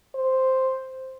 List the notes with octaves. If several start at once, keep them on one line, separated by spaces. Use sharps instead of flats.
C5